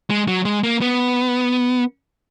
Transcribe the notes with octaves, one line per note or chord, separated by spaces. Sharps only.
G#3
F#3
G#3
A#3
B3